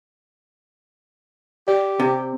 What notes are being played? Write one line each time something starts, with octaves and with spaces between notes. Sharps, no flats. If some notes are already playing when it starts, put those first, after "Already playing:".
G4 D5
C3